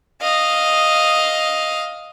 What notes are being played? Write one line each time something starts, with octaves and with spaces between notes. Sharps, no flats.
D#5 F5